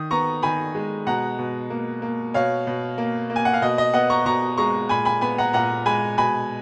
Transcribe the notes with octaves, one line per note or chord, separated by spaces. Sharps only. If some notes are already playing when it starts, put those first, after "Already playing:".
Already playing: D#3 D#6
B3 A#5 C#6
D#3 G#5 B5
G#3
B2 F#5 A#5
B2
A#3
A#3
B2 C#5 F5
B2
A#3
A#3
G#5
F#5
F5
B2 D#5
D#5
B3 D#5 F#5
A#5 C#6
B2 A#5 C#6
G#3 A#5 C#6
A#2 G#5 B5
G#5 B5
B3 G#5 B5
F#5 A#5
A#2 F#5 A#5
G#3 G#5 B5
B2 G#5 B5